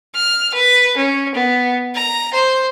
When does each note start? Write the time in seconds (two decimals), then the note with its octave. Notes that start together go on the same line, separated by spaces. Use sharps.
0.14 F6
0.54 B4
0.97 C#4
1.34 B3
1.95 A#5
2.33 C5